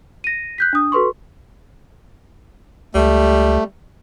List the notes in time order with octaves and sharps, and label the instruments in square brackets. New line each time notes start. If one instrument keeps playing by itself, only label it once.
[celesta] A#6 D#7
F#6 G6 B6
D4 D#6
F#4 A4 B4 C6 C#6
[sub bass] C#2 [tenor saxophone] G3 [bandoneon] A3